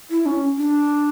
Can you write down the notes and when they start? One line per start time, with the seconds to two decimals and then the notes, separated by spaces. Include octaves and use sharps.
0.11 E4
0.26 C#4
0.57 D4